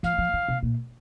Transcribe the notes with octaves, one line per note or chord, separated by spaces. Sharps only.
F3 F5
F3
D#3
C3
A#2